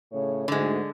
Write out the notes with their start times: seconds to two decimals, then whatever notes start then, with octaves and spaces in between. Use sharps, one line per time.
0.12 A2 C#3 C#5
0.48 D2 G#2 D3 G#3